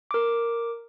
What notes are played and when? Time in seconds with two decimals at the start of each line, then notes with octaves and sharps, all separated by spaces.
0.11 A#4 D6